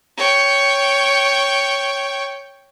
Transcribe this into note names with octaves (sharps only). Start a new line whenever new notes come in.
C#5 G5